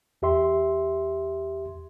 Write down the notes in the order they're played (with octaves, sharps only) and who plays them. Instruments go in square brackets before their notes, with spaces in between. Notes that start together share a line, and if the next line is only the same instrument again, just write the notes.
[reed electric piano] E2 G4 E5 C6